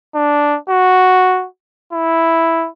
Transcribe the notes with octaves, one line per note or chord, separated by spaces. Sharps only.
D4
F#4
E4